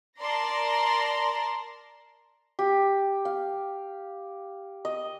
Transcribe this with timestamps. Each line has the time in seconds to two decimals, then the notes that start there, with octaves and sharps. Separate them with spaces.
0.19 A#4 D5 A5 A#5 C6 A#6
2.59 G4
3.25 F5
4.85 D#5